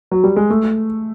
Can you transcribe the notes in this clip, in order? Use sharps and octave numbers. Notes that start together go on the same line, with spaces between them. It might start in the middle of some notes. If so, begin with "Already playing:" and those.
F#3
G3
G#3
A3